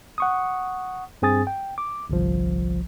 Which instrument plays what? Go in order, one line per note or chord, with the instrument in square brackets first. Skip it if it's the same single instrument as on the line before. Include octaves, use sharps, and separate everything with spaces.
[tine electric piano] F#5 C#6 D#6
G2 C4 G#4 G#5 D#6 A6
G5
D6
G1 C2 F3